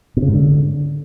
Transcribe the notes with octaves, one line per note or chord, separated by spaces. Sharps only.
B2
C#3
G#2
D3